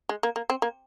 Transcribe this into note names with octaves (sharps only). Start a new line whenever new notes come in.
G#3
A#3
A#3
C4
A#3